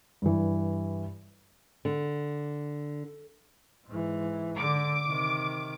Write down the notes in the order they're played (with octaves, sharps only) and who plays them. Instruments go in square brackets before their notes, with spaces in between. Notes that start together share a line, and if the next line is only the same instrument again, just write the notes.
[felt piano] G2 E3
[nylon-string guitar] D3
[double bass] G#2 E3
[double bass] D3 [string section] D6
[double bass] C3 D#3